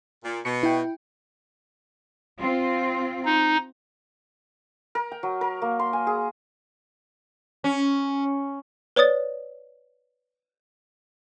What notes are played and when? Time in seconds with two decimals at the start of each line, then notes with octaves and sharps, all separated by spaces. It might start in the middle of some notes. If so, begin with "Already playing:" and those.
0.24 A#2
0.45 B2 C#7
0.63 E4 G5
2.40 C4 F4
3.25 D#4
4.95 A#4
5.12 G5
5.23 F#3
5.41 A#4
5.62 A#3
5.79 C6
5.93 G#5
6.07 G#4
7.64 C#4
8.96 B4 C#5 D5 D#6 A6